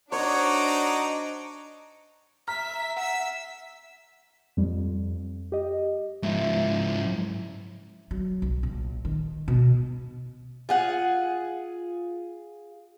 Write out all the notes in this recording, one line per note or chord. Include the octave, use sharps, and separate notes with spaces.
D4 D#4 F#4 C5 C#5 D6
E5 A#5 F6 B6
F#5 E6 B6
F2 G3
G4 D#5
G#2 F3 E4
F#3
B1
A#1
D#3
B2
F4 G#4 F#5